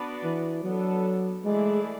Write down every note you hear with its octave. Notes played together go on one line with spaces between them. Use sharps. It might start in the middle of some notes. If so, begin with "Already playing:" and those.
Already playing: B3 D4 F#4 B4 D5
E3
F#3 B3 D4 A4
E3 G#3 A3 E4 G#4 D5